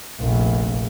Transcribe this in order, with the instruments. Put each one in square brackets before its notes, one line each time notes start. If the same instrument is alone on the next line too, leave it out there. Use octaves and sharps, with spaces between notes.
[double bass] F1 A#1